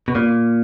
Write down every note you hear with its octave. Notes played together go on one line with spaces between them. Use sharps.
B2
A#2